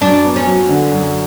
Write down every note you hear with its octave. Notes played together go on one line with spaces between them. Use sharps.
F#2 D4
B3
C#4
F#3
D3
F#2